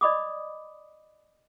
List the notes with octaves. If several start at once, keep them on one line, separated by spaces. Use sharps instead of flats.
D5 D#5 B5 D6 D#6